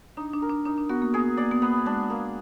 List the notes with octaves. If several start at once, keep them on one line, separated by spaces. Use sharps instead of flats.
D4 D#4
D4
A#4
D4
D4 D#4
D4
B3 F#4
A#3
B3 G#4
A#3 D5
B3
A#3 B3
G#3 D4
A#3